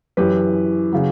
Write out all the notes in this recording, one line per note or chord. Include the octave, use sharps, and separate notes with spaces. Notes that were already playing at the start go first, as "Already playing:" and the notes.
F#2 E3 G4 B4
C#3 F#3